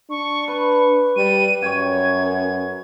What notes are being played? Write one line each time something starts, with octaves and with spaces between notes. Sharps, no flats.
D4 C#6
B4 C#6
G3 D#7
F#2 C#5 G5 G#6